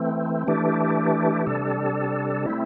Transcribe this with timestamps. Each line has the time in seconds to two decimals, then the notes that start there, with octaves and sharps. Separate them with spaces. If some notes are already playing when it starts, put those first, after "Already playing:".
Already playing: E3 A3 C4
0.47 E3 A3 D4 G4
1.47 C3 G3 D4 A4
2.46 A3 C4 E4